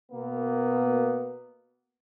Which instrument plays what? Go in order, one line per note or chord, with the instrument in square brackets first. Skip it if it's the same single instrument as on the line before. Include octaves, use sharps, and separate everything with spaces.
[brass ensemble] B2 A#3 B3